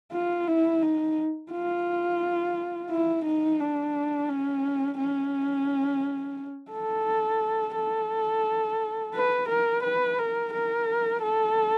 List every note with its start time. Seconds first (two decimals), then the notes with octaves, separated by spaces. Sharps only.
0.13 F4
0.47 E4
0.82 D#4
1.51 F4
2.90 E4
3.25 D#4
3.60 D4
4.29 C#4
4.98 C#4
6.72 A4
7.76 A4
9.14 B4
9.49 A#4
9.83 B4
10.18 A#4
10.53 A#4
11.22 A4